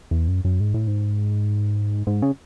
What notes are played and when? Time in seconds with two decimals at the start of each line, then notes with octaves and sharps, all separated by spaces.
0.11 E2
0.28 F#2
0.45 F#2
0.60 G#2
0.74 A2
0.87 G#2
2.07 G#2
2.22 C#3